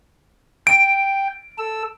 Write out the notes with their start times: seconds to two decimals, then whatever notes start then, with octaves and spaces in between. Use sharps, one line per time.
0.67 G5 D7
1.58 A4 E6